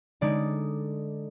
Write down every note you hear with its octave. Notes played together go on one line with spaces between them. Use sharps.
D3 G#3 D#4 D5